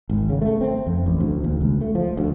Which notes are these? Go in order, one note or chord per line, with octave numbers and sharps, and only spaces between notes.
G#1
C#3
A3
C4
F2
A1
D2
D#2
C#2
A3
F3
D2